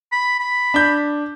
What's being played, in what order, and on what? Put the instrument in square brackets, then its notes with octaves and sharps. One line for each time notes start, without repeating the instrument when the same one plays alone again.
[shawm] B5
B5
[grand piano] D4 G6